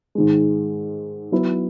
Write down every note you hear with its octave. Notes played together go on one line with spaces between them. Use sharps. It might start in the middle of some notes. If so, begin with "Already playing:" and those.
G#2 D#3 G#3
F#3 B3 E4 B4